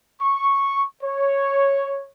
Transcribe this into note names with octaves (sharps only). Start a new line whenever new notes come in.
C#6
C#5